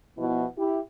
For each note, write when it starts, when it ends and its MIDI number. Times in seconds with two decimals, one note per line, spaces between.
0.18 0.45 47
0.18 0.45 53
0.18 0.45 59
0.18 0.45 64
0.58 0.79 64
0.58 0.79 67